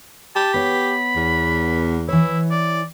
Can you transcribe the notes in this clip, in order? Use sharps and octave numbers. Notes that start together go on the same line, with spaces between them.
G4 A5
B3 C#5 B5
E2
E3 E4 C#5
D5